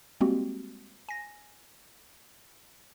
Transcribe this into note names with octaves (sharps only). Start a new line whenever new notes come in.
G3 G#3 A#3 C4 F#4 G4
G#5 A#6